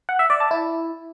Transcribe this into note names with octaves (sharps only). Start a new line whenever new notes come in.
F#5
E5
D5
A5
E4